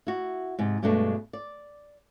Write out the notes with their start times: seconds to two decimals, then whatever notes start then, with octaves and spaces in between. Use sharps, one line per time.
0.07 E4 F#4
0.59 G#2 C3
0.83 G2 B2 G#3 A3 D4
1.33 D5